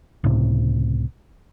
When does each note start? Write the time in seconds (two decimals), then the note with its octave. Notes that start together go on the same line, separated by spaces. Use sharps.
0.24 C#2 A2 C3